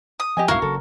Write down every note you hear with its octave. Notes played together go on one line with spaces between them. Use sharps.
D#6
F3 G4 D#5 G#5
B1 F2 G#2 E4 F#4 A#4 F5
F#1 F#2 A4